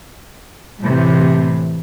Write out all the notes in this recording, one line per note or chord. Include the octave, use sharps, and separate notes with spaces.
A2 C3 E3